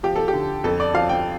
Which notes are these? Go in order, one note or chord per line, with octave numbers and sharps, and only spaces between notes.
F3 G4
A4
G4
D3
F2 A4
D5
F3 F5
G5